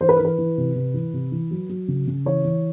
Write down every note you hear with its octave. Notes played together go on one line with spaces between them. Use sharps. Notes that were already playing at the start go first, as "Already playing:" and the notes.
E3 C5
B4
A#4
E3 B4
E3
C3
C3
E3
C3
E3
F#3
F#3
C#3
C#3
E3 C#5
E3